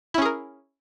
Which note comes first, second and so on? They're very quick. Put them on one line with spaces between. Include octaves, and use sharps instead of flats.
E4 C#4 G#4 A#4